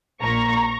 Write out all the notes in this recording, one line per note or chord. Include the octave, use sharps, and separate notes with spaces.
A#1 A#2 A#3 A#5 C#6